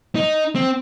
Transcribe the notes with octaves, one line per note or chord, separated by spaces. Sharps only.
D#4
C4